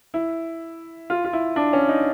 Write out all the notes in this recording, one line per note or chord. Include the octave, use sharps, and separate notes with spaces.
E4
F4
F4
E4
D4
C#4
D#4